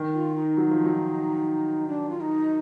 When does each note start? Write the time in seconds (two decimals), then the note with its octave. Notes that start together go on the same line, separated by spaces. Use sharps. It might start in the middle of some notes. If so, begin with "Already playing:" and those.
Already playing: D#3
0.14 F4
0.35 D#4
0.57 F#3
0.71 F3
0.85 F#3
1.88 D4
2.09 F4
2.21 D#4